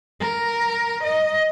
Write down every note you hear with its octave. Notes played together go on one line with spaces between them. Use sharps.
A#4
D#5